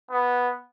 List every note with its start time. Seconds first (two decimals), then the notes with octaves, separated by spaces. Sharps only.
0.11 B3